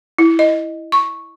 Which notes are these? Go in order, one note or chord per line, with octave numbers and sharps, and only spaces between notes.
E4
D#5
C#6